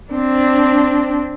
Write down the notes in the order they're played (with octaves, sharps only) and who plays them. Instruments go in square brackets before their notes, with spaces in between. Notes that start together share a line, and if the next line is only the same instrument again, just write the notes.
[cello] C4 D4